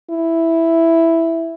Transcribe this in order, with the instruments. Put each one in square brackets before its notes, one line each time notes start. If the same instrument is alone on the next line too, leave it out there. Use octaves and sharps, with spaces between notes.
[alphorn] E4